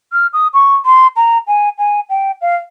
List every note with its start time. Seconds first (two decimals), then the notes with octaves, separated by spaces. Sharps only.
0.13 F6
0.33 D#6
0.54 C#6
0.86 C6
1.16 A#5
1.47 G#5
1.79 G#5
2.10 G5
2.41 F5